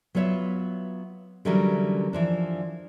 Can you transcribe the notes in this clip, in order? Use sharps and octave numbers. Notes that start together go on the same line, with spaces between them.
F#3 B3 F4 C#5 E5
D3 E3 F#3 G3 C#4 A#4
E3 F3 D4